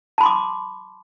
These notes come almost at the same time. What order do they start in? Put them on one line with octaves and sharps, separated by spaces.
A5 B5 C6 D6